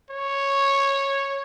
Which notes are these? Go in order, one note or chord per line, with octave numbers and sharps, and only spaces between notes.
C#5